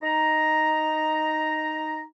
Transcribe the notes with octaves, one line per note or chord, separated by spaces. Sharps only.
D#4 A#5